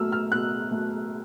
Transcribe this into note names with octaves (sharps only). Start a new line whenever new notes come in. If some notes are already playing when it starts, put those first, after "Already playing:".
Already playing: B2 F#3 A3 E6 F6
F6
B2 F#6
F#3 A3